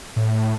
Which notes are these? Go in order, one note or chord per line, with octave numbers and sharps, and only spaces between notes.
A2